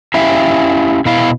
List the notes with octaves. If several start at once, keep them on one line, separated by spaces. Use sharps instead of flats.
C#4 E4 G4 E5 F5
B2 E4 F5